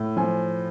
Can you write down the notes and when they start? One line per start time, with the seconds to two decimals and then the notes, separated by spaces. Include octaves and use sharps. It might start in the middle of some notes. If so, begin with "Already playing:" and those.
Already playing: A2
0.17 F3 G#5